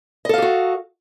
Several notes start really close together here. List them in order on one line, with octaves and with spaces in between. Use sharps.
D#5 A4 F5 G4 F#4